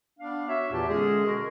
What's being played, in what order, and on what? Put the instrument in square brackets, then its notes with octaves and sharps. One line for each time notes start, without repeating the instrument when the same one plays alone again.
[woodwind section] B3 D4 F5
F#4 C#5 E5
E2 A#2 E3 G4 A5
D3 G#3 C#4 G#4
B2 F#4 A#4